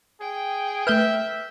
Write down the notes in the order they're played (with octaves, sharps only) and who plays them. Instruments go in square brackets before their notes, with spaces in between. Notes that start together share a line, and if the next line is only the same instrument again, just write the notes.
[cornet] G#4 [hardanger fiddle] G5
[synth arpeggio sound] A3 B4 [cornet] E5 [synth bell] F6 G6 G7